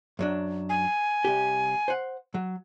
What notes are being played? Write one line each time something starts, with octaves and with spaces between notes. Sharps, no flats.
F#2 F#3 D4
G#5
C2 G4
C5 F#5
F#3